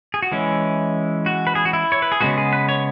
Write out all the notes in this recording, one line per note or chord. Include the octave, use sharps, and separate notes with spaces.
G#4
F#4
E3 G#3 C#4 E4
F#4
B4
G#4
F#4
E4
C#5
B4
G#4
C#3 G#3 B3 F#4
G#4
B4
C#5